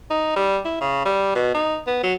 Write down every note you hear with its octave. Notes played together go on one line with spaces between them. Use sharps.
D#4
G3
E4
C#3
G3
B2
D#4
B3
F#3